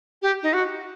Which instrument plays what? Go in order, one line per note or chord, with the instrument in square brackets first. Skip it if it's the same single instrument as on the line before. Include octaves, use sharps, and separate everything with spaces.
[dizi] G4
D#4
F#4